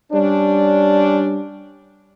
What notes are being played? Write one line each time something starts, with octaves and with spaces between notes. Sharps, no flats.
G3 C#4 D4